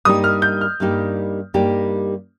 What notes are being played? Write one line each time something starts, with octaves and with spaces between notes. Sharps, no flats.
G2 G3 A#3 D#4 G4 D#6
F6
G6
F6
G2 G3 A#3 D#4 G4
G2 G3 A#3 D#4 G4